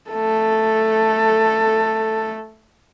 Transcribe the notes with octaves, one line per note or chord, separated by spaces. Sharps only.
A3 A4